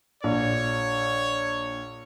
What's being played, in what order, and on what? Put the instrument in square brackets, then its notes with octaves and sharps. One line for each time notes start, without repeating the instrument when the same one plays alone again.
[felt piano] A#1 [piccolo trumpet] C#5